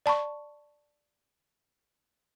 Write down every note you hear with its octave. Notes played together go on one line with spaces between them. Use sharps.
D5 A5 B5 C#6